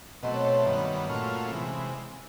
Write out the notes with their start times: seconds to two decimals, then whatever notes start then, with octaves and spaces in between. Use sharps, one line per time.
0.23 B2 F#3 A3 C4 D#5
0.34 C#5
0.45 C#5
0.56 E5
0.66 G2 D#3 F#3 B3 D#5
1.09 A#2 F#3 A3 C#4 F4
1.51 C3 E3 G#3